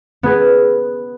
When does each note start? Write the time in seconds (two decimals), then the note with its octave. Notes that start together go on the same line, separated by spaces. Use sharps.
0.23 B3 G#4 B4